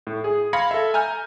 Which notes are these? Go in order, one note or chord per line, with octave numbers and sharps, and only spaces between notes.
A2
G#4
F5 B5 C6 G#6 A#6 C#7
A4 E5
G#5 A#5 F6 G6